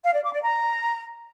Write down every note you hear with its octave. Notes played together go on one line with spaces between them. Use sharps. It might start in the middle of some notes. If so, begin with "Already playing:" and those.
F5
D5
D6
D5
A#5